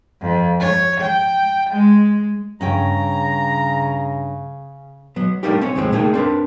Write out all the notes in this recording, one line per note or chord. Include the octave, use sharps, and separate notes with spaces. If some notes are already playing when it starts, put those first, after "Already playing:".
F2
C#5
G5
G#3
G2 C#3 C#4 G5 A#5
F#3 B3
G3 A3 A#3 D4 D#4 G4
C4 C#4 C#5
D#2 A2 F3 G#3 C4
A3 A#3 D#4 G#4 G5
C4 D4 A#4 B4